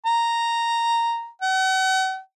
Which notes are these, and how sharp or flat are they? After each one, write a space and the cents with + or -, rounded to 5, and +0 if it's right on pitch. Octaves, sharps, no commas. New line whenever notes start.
A#5 -5
F#5 +40